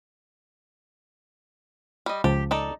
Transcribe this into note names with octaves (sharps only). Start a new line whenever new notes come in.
G3 D#5
C#2 F3 G4 A5
D#4 A4 D5